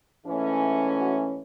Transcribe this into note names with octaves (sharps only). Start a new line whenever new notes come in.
G#2 E3 A3 C#4
F#4